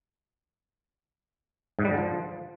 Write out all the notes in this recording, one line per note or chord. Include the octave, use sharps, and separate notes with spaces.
G#2
G3
D3
F3